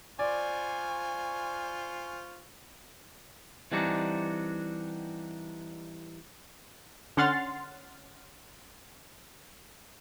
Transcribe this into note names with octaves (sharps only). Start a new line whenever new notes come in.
F4 C5 D5 G#5 C#6
E3 G3 C4 D4 D#4 F#4
D3 C#4 F#5 C6 F6 A6